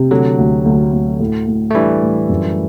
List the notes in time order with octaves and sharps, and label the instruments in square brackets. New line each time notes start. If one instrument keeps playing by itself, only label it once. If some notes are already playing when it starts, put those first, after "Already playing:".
Already playing: [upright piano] C3
[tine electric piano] D3 F#3 [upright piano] A3
[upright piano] D2
D2
D2
A2
A2
[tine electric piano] A3
[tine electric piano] E3 G3 [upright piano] D4
[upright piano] A2
F#2